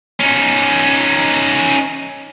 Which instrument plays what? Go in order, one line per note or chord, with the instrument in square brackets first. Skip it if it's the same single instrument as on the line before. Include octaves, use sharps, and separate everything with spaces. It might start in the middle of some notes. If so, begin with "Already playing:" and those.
[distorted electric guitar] C#4 D#4